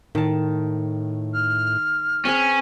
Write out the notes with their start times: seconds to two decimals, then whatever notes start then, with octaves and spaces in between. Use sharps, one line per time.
0.15 A2 D#3 A5
1.33 F6
2.25 C4 C#4 G#4 B4